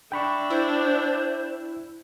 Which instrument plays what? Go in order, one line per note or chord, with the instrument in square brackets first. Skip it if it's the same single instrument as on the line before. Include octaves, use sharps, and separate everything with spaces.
[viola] D4 E5 [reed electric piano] G5 B5 C#6
[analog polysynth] E4 [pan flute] C5